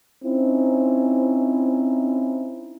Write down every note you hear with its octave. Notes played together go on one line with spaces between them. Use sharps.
C4 C#4 D#4 E4